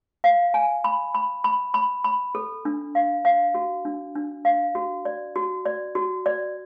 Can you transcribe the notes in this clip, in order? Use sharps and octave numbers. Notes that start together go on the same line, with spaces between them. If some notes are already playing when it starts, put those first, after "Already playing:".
F5
G#5
B5
B5
B5
B5
B5
A4
D4
F5
F5
F#4
D4
D4
F5
F#4
D5
F#4
D5
F#4
D5